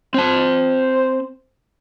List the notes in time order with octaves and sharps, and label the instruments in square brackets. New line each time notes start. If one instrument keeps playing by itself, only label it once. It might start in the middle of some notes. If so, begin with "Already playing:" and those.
[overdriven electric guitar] C4 A5 [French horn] C5